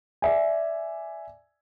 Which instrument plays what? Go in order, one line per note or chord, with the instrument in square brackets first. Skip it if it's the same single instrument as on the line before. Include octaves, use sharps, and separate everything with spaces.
[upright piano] D5 E5 G#5